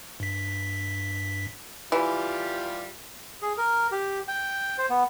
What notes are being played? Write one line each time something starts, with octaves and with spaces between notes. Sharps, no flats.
G2 B6
E3 G3 F4 G4
G#4
A#4
G4
G5
C5
B3